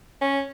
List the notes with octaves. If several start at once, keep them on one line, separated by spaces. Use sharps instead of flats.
C#4